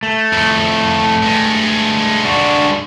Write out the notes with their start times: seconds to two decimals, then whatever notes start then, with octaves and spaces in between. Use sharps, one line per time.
0.03 A3
0.33 F2 A2
1.23 G2 G#3
2.25 D4 F#4